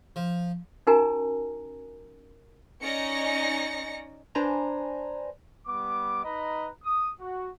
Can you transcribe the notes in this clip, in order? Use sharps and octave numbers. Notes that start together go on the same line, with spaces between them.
F3
C#4 D#4 F#4 A#4 G#5 A#5
C#4 D#4 D5 A#6 C#7
D4 B4 C5 G#5 A#5
G3 B3 D6
D#4 B4 D#5 A#5 B5
D#6
F#4